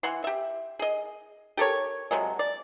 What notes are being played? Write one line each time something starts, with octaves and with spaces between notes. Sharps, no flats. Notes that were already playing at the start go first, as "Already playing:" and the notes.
E3 F#5 C6
G4 E5
G#4 D#5
G4 A4 A#4 C#5
C3 F3 F#3 G#3
D5